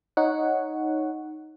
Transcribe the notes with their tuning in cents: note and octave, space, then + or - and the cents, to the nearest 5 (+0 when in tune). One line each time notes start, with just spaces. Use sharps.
D#4 +0 C#5 -5 F#5 +0